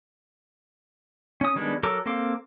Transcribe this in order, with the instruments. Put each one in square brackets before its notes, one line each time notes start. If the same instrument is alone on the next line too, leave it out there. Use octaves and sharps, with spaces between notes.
[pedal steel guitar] C#4 D#6
D#3 G3 G#3 B3 D4
F#3 A4 A#4 A#5 D6
A#3 C4 A4 F5 D6